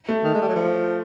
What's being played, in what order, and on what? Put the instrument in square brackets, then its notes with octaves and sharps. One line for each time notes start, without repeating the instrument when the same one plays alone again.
[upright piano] A3
[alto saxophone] D#3
G#3
G3
F#3
F3